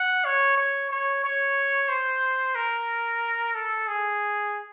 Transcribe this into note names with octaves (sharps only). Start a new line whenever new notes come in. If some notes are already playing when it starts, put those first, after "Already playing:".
Already playing: F#5
C#5
C#5
C#5
C#5
C5
A#4
A4
G#4